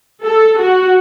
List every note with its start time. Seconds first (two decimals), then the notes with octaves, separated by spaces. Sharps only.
0.24 A4
0.59 F#4